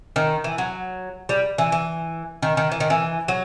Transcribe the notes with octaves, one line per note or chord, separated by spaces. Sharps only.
D#3
E3
F#3
G3
E3
E3
D#3
D#3
E3
D#3
E3
F#3